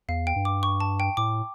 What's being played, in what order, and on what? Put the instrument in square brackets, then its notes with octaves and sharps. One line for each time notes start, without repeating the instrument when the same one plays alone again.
[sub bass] E2 [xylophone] F5
[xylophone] G5
[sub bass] G2
[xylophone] D6
C#6
A5
G5
[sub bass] A2 [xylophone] D6